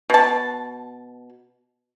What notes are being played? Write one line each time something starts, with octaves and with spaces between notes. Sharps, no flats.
B2 A5